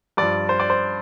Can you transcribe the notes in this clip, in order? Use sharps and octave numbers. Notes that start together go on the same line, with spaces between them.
G2 F3 D5
C5
D5
C5